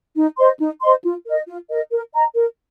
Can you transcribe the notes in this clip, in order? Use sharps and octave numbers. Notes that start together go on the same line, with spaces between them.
D#4
C5 D#5 C6
D#4
C5 D#5 C6
F4
A#4 D#5
F4
A#4 D#5
A#4
D#5 A#5
A#4